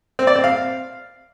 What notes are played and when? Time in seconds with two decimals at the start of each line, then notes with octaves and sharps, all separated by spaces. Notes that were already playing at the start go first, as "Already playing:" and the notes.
0.19 C4
0.27 D5
0.35 C4
0.44 F5